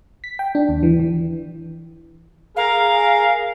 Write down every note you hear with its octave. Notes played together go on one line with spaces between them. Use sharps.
B6
G5
D4
D#2
E3
E3
G#4 A#4 F5